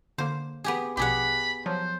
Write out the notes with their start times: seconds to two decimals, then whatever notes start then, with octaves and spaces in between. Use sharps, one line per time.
0.18 D3 A#3 C5
0.64 B3 G4 G#4
0.97 A#1 B2 G4 G#4 F#5 B5
1.66 F3 F#3 C5